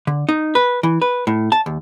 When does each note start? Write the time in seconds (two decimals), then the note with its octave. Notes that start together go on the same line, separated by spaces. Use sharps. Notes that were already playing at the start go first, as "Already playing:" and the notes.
0.07 D3
0.29 D#4
0.55 B4
0.83 E3
1.02 B4
1.27 A2
1.52 A5
1.66 D#2